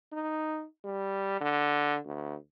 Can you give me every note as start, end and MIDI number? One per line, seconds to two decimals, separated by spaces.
0.13 0.65 63
0.85 1.38 55
1.41 1.98 50
2.05 2.36 38